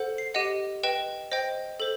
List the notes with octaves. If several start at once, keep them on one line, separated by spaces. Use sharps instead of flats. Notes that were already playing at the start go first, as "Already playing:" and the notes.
Already playing: A4 C5 F#5
C7
G4 D#5 F#5 D#7
B4 D#5 G5 E7
C5 D#5 G5
A4 C5 F#7